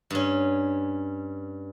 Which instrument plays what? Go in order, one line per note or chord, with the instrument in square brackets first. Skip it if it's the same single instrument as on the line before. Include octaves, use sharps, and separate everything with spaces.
[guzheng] G2 C#4